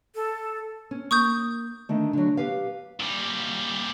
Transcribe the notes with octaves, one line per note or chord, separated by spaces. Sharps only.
A4
C#4
A#3 C#6 D#6 G6
D3 D#3 A3
D3 F#3
G4 B4 F5
A#2 G3